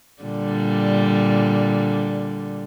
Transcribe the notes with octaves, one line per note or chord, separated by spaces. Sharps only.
A#2 D3 G3